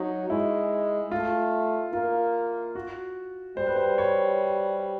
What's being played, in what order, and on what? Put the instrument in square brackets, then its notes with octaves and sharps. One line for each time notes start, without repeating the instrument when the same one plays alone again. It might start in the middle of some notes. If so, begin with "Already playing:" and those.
Already playing: [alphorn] F#3 [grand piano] D#4
[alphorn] G#3 [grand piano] E4
[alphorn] A3 [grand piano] F4
[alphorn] A#3 [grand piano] F4
[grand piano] F#4
[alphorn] G3 [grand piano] C5
[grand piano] B4
C5
C#5